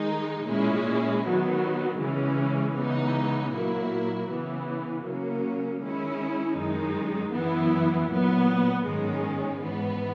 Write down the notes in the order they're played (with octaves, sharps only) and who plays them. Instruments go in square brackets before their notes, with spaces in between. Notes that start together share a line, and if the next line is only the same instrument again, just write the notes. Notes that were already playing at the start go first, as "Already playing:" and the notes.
Already playing: [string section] D#3 G#3 D#4
A#2 G#3 C#4 E4
D#3 F#3 B3
C#3 E3 G#3 C#4
C#3 E3 G#3 B3 D#4
A#2 F#3 A#3 E4
C#3 E3 B3
C#3 F#3 A#3 C#4
D#3 G#3 C#4 E4
F#2 D#3 G#3 D#4
F#2 E3 B3 E4
A#2 F#3 B3
G#2 D#3 G#3 C#4
G#2 E3 B3